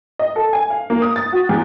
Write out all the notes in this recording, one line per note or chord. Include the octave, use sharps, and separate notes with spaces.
D#5
A4
G#5
F5
A#3
D#6
A6
F#4
E2